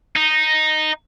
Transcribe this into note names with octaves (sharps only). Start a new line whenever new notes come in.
D#4